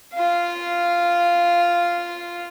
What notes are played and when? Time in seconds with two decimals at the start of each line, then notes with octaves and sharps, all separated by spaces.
0.14 F4 F5